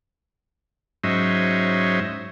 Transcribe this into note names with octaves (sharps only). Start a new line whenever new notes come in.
G#2 F#3 C#4 C5 D#5 E5